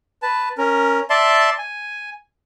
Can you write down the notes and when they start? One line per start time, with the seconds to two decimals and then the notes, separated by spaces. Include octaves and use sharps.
0.22 B4 A5
0.58 C#4 A#4
1.10 D5 E5 A5 C6
1.58 G#5